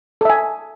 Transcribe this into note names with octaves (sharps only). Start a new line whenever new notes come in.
A4 E5 G#5